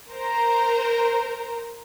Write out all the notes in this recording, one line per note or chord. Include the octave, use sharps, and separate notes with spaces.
A#4 C5 A#5